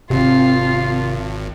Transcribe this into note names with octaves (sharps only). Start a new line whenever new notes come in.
G#1 C3 C4 F4